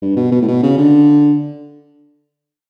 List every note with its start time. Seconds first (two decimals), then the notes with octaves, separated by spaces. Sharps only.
0.02 G2
0.16 B2
0.32 B2
0.42 A2
0.48 B2
0.63 C#3
0.78 D3